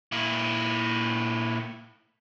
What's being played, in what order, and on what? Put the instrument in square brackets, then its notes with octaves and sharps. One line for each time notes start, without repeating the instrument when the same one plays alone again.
[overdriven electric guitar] A#2 E4